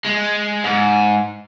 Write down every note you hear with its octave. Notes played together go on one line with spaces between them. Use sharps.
G#3
G#2